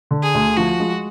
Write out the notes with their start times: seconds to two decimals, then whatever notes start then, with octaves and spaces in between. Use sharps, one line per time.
0.11 D3
0.23 G#4
0.35 D2
0.57 F3 F#4
0.80 G#3